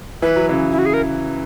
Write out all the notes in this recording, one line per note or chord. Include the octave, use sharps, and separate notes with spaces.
E3 B4
F#3
C#3 E3
E4
F#4
G#4
A#4